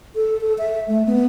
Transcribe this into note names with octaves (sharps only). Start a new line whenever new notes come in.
A4
A4
E5
A3
B3